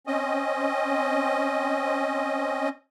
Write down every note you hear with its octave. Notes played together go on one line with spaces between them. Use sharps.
C4 C#4 D#5